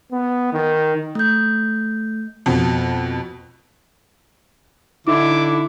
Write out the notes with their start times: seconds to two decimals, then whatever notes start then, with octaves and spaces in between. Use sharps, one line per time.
0.12 B3
0.53 D#3
1.15 A3 G6
2.46 F2 B2
5.07 D3 D#4 E4 D6